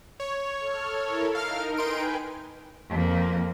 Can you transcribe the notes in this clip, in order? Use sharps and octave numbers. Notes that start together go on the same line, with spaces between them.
C#5
A4 F6
E4 A4 A#4
D#4 A#4 F5 F6
D#4 B4 G5 G#5 C6 D7
F2 A#3